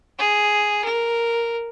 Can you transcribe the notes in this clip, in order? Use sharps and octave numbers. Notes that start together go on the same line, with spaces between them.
G#4
A#4